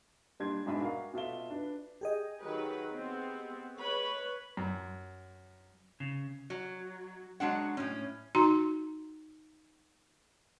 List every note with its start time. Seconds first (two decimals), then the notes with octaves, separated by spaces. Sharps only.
0.40 A#2 G3 D4 C6 G#6
0.66 G#2 B2 D4 E5 G#5 B5
0.81 F#4 A#4 F5
1.14 B2 F4 A4 E5 G7
1.50 D4 B4
2.01 G4 G#4 D#5
2.43 D#3 F#3 B4
2.91 B3 C4
3.77 B4 C#5 B5
4.57 F#2
6.00 C#3
6.50 F#3
7.40 F#3 G#3 D4 F#5
7.77 A2 C#4
8.35 D#4 F#4 A#5 C6